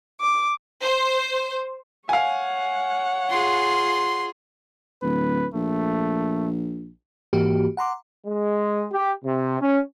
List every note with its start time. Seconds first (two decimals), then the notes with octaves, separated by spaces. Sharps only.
0.21 D6
0.82 C5
2.09 C#5 F5 F#5 G#5
3.30 F4 G#4 C6
5.02 D1 B4
5.54 A#1 A3
7.33 G#2 E3 A#3 F#4 G4
7.77 F#5 A#5 C6 D6
8.26 G#3
8.93 G4
9.24 C3
9.60 C#4